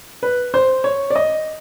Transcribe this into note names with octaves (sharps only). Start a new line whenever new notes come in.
B4
C5
C#5
D5
D#5